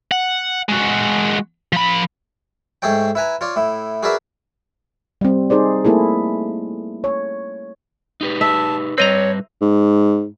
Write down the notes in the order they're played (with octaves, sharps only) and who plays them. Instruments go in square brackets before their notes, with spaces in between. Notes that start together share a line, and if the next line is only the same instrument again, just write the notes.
[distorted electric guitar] F#5
G#3 F#4
F3 B5
[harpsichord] G#2 A3 G#4 A4 C#5 G5
E4 B4 G#5 A#5
F4 C#5 D5
A2 E4
F#4 G#4 A#4 B4 D5 E5
[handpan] G3 C4
D#4 G#4 C5 D5
A3 A#3 E4 G#4 A4
C#5
[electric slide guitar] D#4 G4 B4
[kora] E5 [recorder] A5
[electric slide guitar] G3 B4 [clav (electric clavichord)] C4 D#5 A#5 [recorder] C#5
[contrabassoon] G#2